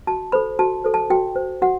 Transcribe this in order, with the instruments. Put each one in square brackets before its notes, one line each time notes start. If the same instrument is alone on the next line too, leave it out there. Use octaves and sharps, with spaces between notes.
[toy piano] F#4 A5
A4 C5 B5
F#4 A5
A4 C5
A5
F#4 G5
C5
F#4 F#5